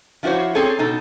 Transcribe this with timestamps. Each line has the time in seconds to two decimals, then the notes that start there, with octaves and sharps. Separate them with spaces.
0.23 F3 E4 F#4 C5 C#5
0.55 C4 G#4 A4 C#5
0.79 B2 D#4 A4